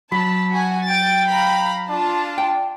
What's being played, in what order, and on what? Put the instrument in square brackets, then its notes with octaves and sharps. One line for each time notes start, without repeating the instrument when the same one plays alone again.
[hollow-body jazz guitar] F#3 [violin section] A5 [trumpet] B5
[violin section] F#4 G#5
[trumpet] G5 [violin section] A6 D7
[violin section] F5 A#5 B5
[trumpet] D4 [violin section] F4 A5
[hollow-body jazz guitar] G5